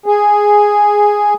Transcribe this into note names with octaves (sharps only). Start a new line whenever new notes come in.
G#4